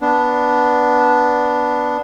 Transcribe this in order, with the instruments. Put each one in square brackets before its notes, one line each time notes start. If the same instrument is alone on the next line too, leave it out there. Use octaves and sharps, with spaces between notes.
[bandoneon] B3 D4